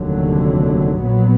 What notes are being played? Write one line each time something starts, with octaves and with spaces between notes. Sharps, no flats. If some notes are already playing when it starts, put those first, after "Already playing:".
Already playing: F1 D#2 D3 F#3
A#1 A#2 F#3 B3